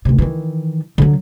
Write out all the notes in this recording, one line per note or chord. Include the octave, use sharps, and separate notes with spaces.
D2 C3
D#3 E3
D3 F#3